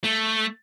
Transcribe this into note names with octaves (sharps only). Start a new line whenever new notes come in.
A3